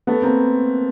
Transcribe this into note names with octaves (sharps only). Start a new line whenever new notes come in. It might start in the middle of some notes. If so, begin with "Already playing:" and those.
A3 B3
A#3 C4